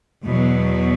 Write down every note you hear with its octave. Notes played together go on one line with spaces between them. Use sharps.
E2 B2 F#3